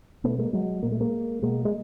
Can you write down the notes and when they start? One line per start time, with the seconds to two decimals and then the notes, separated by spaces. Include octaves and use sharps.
0.24 B2 A3 B3
0.38 G#3 A#3
0.53 F#3 G#3
0.83 A#2 A#3
0.92 A3
1.00 G#3 A#3
1.42 B2 G#3 A#3
1.65 G#3